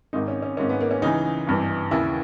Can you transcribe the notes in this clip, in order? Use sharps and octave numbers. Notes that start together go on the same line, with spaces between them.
G#1 G#2 D#3 D#4
C#4
C#4
G#1 G#2 D#3 C#4
B3
A#3
C#4
C#2 C#3 E3 D#4
G#1 G2 E3
D#2 C#3 E3 E4